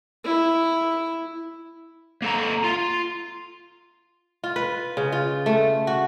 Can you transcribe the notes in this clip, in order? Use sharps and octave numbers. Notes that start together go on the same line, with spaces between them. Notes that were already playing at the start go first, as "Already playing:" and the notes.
E4
A#3 A4 A#5
F4
F4
B4
C#3
F4
A3
F#4